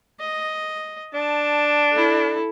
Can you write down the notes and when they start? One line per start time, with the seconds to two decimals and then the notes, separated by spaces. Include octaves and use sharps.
0.20 D#5
1.14 D4 A5
1.93 E4 A4